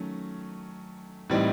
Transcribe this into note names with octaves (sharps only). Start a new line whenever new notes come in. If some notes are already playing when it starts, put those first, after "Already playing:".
Already playing: D#3 F#3 A3 C#4
A2 E3 G3 C4 D#4